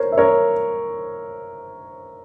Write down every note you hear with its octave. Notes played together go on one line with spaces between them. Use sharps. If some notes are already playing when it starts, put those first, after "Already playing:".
Already playing: A#4 C5 C#5
E5
A#4 C#5